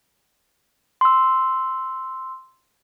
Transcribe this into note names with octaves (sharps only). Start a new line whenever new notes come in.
C6 E6